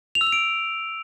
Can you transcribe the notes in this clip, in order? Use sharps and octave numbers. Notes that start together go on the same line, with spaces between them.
F7
E6
F7
D7